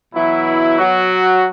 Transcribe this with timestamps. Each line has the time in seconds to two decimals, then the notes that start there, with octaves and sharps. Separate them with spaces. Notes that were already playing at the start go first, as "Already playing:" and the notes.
0.14 B2 E3 F#3 E4
0.78 F#3 F#4